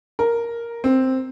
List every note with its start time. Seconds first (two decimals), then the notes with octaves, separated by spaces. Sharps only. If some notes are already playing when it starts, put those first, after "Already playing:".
0.19 A#4
0.84 C4